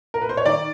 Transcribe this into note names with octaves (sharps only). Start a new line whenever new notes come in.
A#4
B4
C5
C#5
D#3 D5